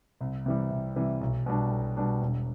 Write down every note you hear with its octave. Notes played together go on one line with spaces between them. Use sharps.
C2
C3 E3 G3
C2
C3 E3 G3
B1
B2 G3 D4
B1
B2 G3 D4
E1